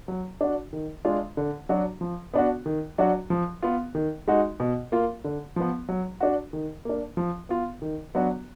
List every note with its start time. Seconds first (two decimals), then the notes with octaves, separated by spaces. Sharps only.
0.08 F#3
0.41 D4 F#4
0.73 D#3
1.05 G#3 D4 F4
1.37 D3
1.69 F#3 D4 F#4
2.01 F3
2.34 B3 D4 F#4
2.66 D#3
2.98 F#3 D4 F#4
3.30 F3
3.63 B3 F4
3.95 D#3
4.28 G#3 D#4 F#4
4.60 B2
4.92 A#3 F4
5.24 D3
5.56 F3 B3
5.89 F#3
6.20 D4 F#4
6.53 D#3
6.85 A#3 D4
7.17 F3
7.49 B3 F4
7.82 D#3
8.15 F#3 B3 D4 F#4